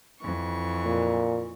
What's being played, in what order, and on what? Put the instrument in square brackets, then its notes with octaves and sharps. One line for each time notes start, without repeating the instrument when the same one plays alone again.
[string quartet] F2 E3 C#6
[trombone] A#2